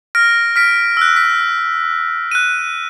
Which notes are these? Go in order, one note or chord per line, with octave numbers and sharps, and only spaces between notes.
F6 A#6 D7
F6 B6 D7
E6 F#6
B6
F#6 D#7